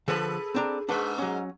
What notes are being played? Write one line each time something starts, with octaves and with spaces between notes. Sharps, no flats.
D3 F3 G#4 A4 B4
C4 D4 A#5
G#2 G#3 D4 B4 F#5
F#3 C#4